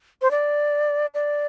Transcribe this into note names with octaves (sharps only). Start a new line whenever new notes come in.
C5
D5
D5